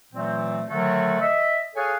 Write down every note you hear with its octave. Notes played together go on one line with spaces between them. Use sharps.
A#2 E3 F#3 A3 C4
D3 D#3 F#3 A3 F#4 A4
D#5 E5
G#4 A4 C#5 F5 F#5 G#5